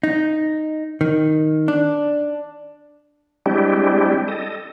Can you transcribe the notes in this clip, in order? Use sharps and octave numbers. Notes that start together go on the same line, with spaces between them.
D#4
D#3
D4
G3 G#3 C4 D4 E4 G4
A4 D#5